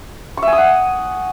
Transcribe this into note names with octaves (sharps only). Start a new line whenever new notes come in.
C#6
E5
G#5
D#6
F#5